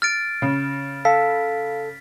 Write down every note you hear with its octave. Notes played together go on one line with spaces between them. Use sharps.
F6 A6 D7
C#3
A4 F5 B6